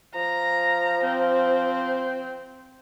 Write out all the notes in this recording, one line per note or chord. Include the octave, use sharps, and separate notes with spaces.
F3 A#5
C4